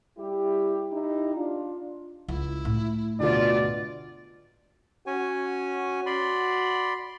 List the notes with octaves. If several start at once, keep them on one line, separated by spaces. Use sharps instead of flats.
G3 E4 G4
D#4 E4 G4
D4 F4
C#2 E4
A2
D2 B2 F4 D5
C#4 F#4 C#5 G#5
D5 B5 C6